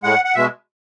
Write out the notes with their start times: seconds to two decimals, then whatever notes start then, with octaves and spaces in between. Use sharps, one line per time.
0.04 A2 G#3 F#5
0.25 F#5
0.35 B2 G#3 E5